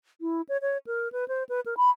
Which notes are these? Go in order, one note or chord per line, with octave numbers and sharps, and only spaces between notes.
E4
C#5
C#5
A#4
B4
C5
B4
A#4
B5